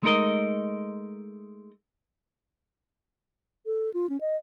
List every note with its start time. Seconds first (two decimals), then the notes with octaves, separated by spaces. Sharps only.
0.03 G#3 A3 D#4 A#4 D#5
3.66 A4
3.94 F4
4.10 C#4
4.21 D#5